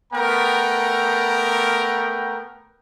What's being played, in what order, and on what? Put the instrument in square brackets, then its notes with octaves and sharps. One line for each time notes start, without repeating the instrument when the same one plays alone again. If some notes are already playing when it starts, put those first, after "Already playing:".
[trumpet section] A3 B3 A#4 G5 A#5